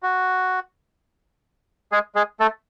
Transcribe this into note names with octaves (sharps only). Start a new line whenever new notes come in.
F#4
G#3 G#4
G#3 G#4
A3 A4